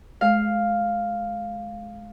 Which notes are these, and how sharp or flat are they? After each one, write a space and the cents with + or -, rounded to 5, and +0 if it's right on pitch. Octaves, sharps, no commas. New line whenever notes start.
G#3 +30 F5 +0